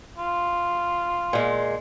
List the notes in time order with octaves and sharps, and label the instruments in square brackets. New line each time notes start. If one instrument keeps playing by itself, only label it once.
[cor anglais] F4
[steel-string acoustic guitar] A#2 G#3